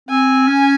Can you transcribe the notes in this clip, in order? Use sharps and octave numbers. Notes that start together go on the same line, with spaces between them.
C4 G#5
C#4